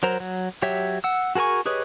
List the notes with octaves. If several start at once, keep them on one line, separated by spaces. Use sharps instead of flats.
F#3 A#4 C5 A#5
F#3
F#3 G4 C#5 E5
F#5 E6
F#4 G#4 A#4 G#5 C#6
G4 G#4 B4 C#5 D#5